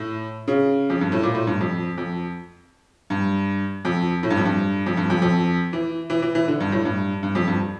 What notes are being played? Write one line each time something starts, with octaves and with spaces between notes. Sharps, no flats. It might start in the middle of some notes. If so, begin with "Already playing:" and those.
Already playing: A2
C#3
F2
G2
A2
A#2
A2
G2
F2
F2
G2
F2
A2
G2
F2
G2
F2
G2
F2
F2
E3
E3
E3
E3
D3
G2
A2
G2
G2
F2
G2